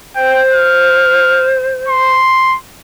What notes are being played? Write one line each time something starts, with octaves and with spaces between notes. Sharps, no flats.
C5 G5
F6
C6